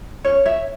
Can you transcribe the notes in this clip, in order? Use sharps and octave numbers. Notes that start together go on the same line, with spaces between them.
C#4 C#5
C#5 E5